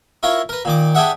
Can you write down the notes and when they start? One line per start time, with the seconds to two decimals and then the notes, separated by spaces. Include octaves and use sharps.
0.23 E4 F4 A#4 C#5
0.49 A#4 B4
0.65 A#2 D#3 D6
0.95 D4 G4 G#4 E5 F#5